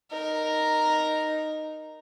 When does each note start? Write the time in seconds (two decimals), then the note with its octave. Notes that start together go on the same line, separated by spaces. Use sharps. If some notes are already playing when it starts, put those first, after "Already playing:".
0.12 D#4 A#4 A#5